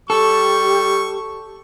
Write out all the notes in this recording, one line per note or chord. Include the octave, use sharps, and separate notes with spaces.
G3 G4 A4 C#6